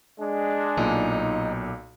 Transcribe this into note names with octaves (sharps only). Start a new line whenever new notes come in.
G#3 D4
B1 A#2 D#4 D6